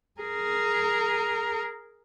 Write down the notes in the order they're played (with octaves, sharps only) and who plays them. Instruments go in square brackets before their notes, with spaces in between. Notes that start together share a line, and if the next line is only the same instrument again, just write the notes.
[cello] G#4 A#4